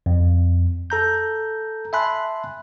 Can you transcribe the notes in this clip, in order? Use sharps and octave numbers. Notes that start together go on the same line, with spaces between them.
F2
A4 A#5 G6
E5 G#5 A5 B5 C6 F#6